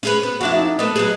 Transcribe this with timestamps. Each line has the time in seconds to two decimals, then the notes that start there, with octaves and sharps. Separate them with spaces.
0.03 C#4 G#4 B4
0.23 B3
0.41 F2 D4 E4 F#4
0.56 D#4
0.79 A3 B3 D#5
0.96 F#3 B3 G#4